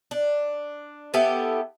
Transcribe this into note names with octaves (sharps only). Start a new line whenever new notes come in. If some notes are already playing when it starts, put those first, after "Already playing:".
D4
B3 E4 G4 A4